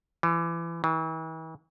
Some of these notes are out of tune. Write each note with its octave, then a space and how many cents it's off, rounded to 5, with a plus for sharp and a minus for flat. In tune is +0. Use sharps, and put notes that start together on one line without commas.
E3 +30
E3 -40